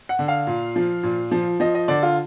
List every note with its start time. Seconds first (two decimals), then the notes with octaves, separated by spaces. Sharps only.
0.09 F#5
0.19 D3
0.28 F5
0.47 A#2
0.76 F3
1.03 A#2
1.31 F3
1.60 F3 D#5
1.75 D#5
1.88 D3 D5
2.03 F4